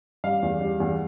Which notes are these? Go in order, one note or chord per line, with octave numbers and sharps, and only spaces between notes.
G3 F5
E2
G3
E2